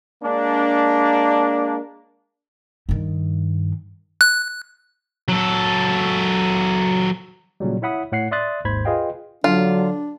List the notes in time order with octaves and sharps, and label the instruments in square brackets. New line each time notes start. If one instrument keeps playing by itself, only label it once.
[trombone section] G#3 A#3 D4
[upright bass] G2 D#3
[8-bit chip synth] F#6
[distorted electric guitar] F#3 A4
[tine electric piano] A#2 C#3 F#3 G3
E4 C#5 E5 F#5 B5 D#6
A2 C#5 F#5 F#6 C7
D5 E5 C6 D#6 F#6 A6
G#1 D#2 G#2 C5 B5 G#6
F4 G#4 B4 D#5 F5 G5
[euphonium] D3 [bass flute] F#3 [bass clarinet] D4 [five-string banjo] F4